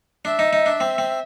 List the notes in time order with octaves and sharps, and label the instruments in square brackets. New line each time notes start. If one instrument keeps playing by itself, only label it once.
[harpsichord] D4 [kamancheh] E5
[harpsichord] D#4
D#4
D4
C4
C4